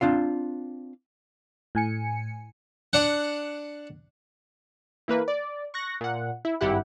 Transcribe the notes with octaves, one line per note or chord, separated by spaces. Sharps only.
C4 D4 F4 F5
A2 G#5 C#7
D4 F#5
E3 A#3 B4
D5
C#6 F#6 A#6
A#2 F#5
E4
G#1 G2 E4 G4 F#5